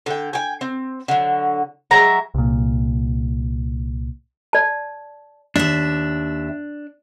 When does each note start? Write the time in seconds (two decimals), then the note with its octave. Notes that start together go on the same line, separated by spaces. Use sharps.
0.06 D3 G5
0.33 G5 G#5
0.61 C4
1.08 D3 F#3
1.91 F#3 G#3 E5 A#5
2.35 C2 A#2
4.53 D5 A5
5.56 D#2 D4 E5